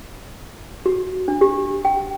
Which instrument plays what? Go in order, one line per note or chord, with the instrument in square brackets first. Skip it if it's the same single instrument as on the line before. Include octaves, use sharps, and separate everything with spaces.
[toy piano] F#4
D4
G4
G5